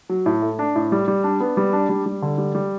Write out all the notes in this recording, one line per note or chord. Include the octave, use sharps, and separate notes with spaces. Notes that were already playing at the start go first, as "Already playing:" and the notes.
F#3
A2
A3
D4
A2
G3
G3
D4
B3
G3
D4
G3
G3
D3
G3
G3